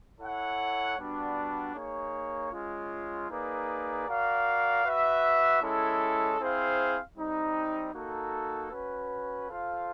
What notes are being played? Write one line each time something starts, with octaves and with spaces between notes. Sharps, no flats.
E4 A4 C#5 F#5
G3 B3 D4 F#4
A#3 D#4 G#4 C#5
G#3 C#4 F4
A#3 D#4 G#4 B4 D5
F#4 A#4 D5 F5
F#4 B4 E5
G#3 C#4 E4 A4
C4 E4 G#4 C5 F5
G3 C4 D#4
A#3 D#4 F#4 A4
C#4 F#4 B4
F4 A4 C5 F5